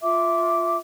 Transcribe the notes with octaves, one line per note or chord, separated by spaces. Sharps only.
F4 E5 D6